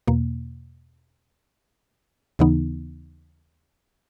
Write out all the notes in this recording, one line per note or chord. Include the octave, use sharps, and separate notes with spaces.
E2 B2 A#3
D#2 C#3 E3 B3 D#4